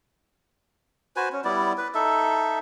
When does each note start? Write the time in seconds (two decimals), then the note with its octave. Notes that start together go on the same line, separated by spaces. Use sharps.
1.16 F#4 B4 C5 G#5
1.32 C#4
1.45 G3 B3 E4 D5
1.78 B4
1.95 D#4 A4 E5